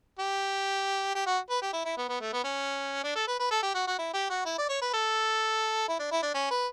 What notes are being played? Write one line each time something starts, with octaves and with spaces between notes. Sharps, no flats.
G4
G4
F#4
B4
G4
E4
E4
B3
B3
A3
B3
C#4
D4
A4
B4
B4
A4
G4
F#4
F#4
E4
G4
F#4
E4
D5
C#5
B4
A4
E4
D4
E4
D4
C#4
B4